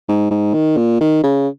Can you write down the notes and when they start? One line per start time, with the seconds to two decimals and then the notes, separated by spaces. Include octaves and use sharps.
0.09 G#2
0.31 G#2
0.54 D#3
0.77 A#2
1.01 D#3
1.24 C#3